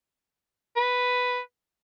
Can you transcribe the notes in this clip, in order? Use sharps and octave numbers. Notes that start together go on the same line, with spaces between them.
B4